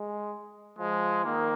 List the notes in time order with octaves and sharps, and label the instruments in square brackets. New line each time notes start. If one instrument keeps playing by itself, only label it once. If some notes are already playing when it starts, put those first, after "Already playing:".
Already playing: [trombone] G#3
[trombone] F3 [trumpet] G#3
[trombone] D#3 [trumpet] A#3